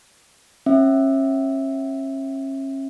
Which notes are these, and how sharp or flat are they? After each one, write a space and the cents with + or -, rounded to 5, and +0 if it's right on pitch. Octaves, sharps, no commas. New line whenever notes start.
C#4 -40 E5 +0